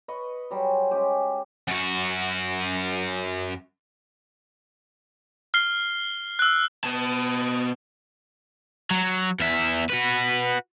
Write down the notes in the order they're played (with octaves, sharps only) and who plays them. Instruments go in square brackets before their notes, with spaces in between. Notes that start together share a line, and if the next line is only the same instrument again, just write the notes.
[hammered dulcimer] B4 D#5 C#6
F#3 G3 G#4 C5
G#3 C#4 G4
[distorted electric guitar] F#2 F#4
[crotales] F6 C7 G7
E6 F#6
[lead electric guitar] B2 A5
[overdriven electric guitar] F#3
E2 E5
F#4 B4